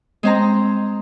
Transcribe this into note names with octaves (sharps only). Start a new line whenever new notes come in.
G#3 C4 A#5